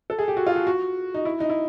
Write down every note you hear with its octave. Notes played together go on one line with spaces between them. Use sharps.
A4
G#4
G4
F#4
F4
F#4
F#4
D#4
E4
D#4
E4